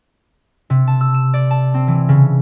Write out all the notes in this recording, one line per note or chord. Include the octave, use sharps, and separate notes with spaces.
C3
A5
E6
E7
D5
A5
C4
E3
C#3